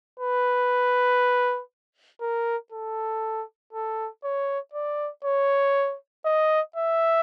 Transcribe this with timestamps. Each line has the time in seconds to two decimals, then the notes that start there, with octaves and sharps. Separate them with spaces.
0.20 B4
2.21 A#4
2.72 A4
3.73 A4
4.24 C#5
4.74 D5
5.25 C#5
6.25 D#5
6.76 E5